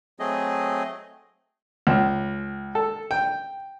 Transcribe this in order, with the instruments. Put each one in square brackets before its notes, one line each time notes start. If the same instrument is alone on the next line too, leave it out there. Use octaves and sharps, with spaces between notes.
[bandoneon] F#3 A3 C4 G#4 D#5
[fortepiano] C#2
A4
G5